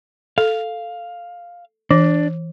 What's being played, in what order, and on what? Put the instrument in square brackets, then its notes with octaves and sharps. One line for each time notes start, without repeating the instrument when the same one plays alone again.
[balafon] A4 [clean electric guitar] F5
[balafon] E3 [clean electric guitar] D4